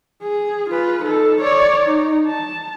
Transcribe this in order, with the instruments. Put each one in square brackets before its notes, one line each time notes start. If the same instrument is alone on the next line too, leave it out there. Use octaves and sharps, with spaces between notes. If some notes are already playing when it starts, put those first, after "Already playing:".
[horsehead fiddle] G#4
F4 B4
D#4 A4
C#5 D5
D#4
A5